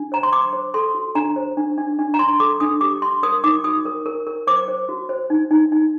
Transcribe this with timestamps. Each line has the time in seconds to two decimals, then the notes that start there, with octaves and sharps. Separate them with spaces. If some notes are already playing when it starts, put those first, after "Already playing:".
Already playing: D4
0.12 C5 A#5
0.23 C6
0.32 C5 D6
0.53 C5
0.74 A4 C6
0.95 F#4
1.15 D4 A#5
1.36 C5
1.57 D4
1.78 D4
1.99 D4
2.14 A#5
2.19 D4 C6
2.40 A4 D6
2.60 D4 D#6
2.81 G4 D6
3.02 G4 C6
3.23 A#4 D#6
3.44 D#4 D6
3.64 F#4 D#6
3.85 A#4
4.06 A#4
4.27 A#4
4.47 C5 D6
4.68 C5
4.89 F#4
5.09 C5
5.30 D#4
5.51 D#4
5.72 D#4